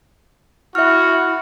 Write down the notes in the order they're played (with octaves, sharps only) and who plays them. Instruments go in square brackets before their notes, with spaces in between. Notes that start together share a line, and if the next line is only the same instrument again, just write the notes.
[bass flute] E4 [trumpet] F#4 [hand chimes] E5 F6